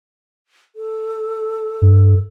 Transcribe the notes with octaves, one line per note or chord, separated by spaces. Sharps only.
A4
G2